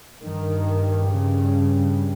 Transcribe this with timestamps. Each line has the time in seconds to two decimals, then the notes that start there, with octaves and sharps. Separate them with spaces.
0.22 G2 D#3
1.08 C#3